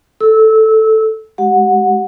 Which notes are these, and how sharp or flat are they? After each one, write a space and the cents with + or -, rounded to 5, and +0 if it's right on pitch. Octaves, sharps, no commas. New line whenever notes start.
A4 +0 E6 -20
G#3 +0 G4 -30 F#5 -15